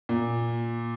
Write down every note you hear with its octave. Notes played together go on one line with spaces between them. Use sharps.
A#2